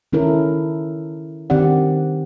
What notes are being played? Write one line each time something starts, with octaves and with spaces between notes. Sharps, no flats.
D#3 C#4 E4 A4 A#4
D#3 C4 G4 D5 F#5